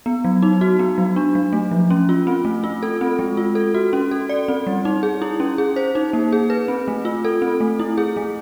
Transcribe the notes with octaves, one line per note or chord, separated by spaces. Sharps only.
B3
F#3
D#4
F#4
B3
F#3
D4
F#3
A3
F3
C#4
F4
C4
A3
F4
A4
C4
G#3
F4
A4
F#4
C#4
A4
D5
C4
G3
D#4
G#4
E4
C#4
G#4
C5
D#4
A#3
G#4
B4
C4
A3
F4
A4
C4
A3
E4
G#4
A3